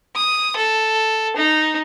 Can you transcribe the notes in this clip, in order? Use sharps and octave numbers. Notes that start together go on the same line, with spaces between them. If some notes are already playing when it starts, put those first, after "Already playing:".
D#6
A4
D#4